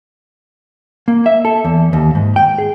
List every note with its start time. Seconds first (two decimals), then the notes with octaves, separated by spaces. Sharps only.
1.08 A#3
1.26 E5
1.45 A4
1.64 E2
1.93 D#2
2.15 G#2
2.36 G5
2.58 G#4